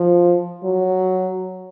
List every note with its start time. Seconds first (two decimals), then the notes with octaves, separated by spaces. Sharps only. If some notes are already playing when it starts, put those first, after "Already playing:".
Already playing: F3
0.64 F#3